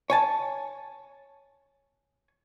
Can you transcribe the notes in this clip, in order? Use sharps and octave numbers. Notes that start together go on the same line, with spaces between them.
C#5 G#5 A5